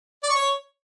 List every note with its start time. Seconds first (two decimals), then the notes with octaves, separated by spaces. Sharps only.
0.24 D5
0.30 C#6
0.36 C#5